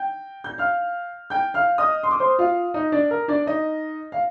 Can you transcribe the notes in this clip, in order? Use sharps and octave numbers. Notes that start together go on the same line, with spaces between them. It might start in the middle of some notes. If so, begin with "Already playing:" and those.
Already playing: G5 G6
G6
F5 F6
G5 G6
F5 F6
D#5 D#6
C6
D6
C5 C6
F4 F5
D#4 D#5
D4 D5
A#4
D4 D5
D#4 D#5
F5